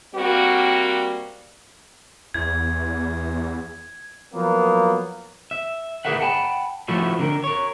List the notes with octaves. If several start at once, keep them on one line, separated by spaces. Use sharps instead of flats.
G3 A#3 C4 F#4
E2 G#6
F3 F#3 A#3 B3
E5
G#4 A#4 B4 E5 F#5
F#5 G5 A5 B5
F3 A3 E4 F#4
D3 A#4
A#4 C#5